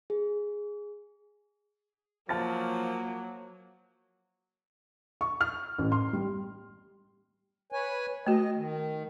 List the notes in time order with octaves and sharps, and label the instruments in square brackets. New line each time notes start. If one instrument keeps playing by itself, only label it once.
[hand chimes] G#4
[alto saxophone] F3 [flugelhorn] F#3 [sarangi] A#3 [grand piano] A5 F6 A6
[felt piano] C#6
F6
A1
C6
G3
[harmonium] B4 C#5 G#5
[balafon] A3 F#4 [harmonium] D#5
[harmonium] D#3